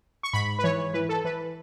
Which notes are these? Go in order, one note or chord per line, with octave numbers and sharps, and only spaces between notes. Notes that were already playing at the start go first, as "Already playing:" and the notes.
C#6
G#2 B5
B4
E3 C#5
E3 B4
A4
E3 B4